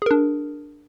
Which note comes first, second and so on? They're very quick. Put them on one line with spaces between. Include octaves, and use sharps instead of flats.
G#4 A#4 D4